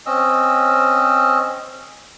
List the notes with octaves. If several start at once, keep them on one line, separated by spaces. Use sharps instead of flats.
C4 C#4 D#5 E6